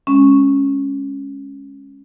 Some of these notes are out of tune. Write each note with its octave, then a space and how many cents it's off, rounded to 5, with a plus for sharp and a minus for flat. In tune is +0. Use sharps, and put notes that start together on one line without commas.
G#3 +0 C#4 -5